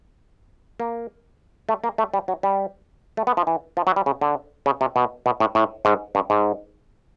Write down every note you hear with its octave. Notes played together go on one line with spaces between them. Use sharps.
A#3
A3
A#3
A3
G3
F#3
G3
A3
B3
F3
E3
F3
F#3
G3
C#3
D3
C#3
C3
B2
B2
A2
A2
G#2
G2
G#2